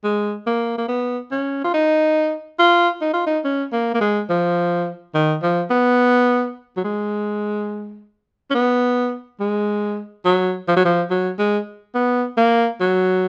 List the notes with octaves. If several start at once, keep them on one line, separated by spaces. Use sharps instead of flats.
G#3
A#3
A#3
B3
C#4
F4
D#4
F4
D#4
F4
D#4
C#4
A#3
A#3
G#3
F3
D#3
F3
B3
F#3
G#3
C#4
B3
G#3
F#3
F3
F#3
F3
F#3
G#3
B3
A#3
F#3